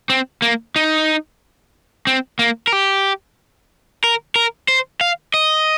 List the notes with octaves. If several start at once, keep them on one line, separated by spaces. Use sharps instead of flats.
C4
A#3
D#4
C4
A#3
A#4
G4
A#4
A#4
C5
F5
D#5